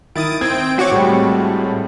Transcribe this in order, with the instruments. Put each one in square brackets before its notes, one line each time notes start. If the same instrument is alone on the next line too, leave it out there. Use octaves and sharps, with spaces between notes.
[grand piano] D#3 E4 [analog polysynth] D#6 A6 D7
[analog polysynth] C4 G5 D7 [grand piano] G#6
[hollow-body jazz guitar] F#4 C#5 [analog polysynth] F#5 C#6 D6
[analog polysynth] A2 [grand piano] G3 G#3 C4